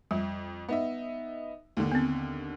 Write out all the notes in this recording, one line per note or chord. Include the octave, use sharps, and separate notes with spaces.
F2 G3
B3 D#4 E5
D#2 D3
B3 C4